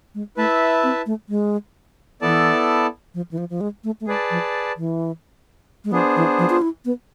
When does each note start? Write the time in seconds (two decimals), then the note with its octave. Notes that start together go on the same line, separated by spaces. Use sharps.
0.15 G#3
0.37 A3 E4 B4 E5 A5
0.83 C4
1.06 A3
1.29 G#3
2.22 E3 B3 E4 A4 D5 A5
3.14 F3
3.31 E3
3.38 F3
3.50 F3
3.61 G#3
3.84 A3
4.01 A3
4.07 G#3 G#4 B4 D5 A5
4.30 F3
4.77 E3
5.84 G#3
5.92 F3 B3 D4 G#4 C5
6.16 E3
6.39 F3
6.50 F4
6.62 E4
6.85 B3